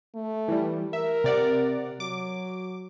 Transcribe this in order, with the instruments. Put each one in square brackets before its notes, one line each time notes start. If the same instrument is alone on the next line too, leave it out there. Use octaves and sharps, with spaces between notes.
[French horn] A3
[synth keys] E3 G3
[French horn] A#4 [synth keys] E5
[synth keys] C3 D5 F#5
[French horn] F#3 [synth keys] D6